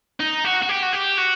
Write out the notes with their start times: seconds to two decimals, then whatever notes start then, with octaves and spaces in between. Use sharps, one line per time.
0.20 D#4
0.45 F#4
0.63 F#4
0.69 G4
0.83 F#4
0.93 G4
1.18 F#4